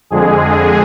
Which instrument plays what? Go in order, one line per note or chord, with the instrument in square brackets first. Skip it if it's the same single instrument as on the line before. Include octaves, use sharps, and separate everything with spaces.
[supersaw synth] F2 D3 G#3 G#4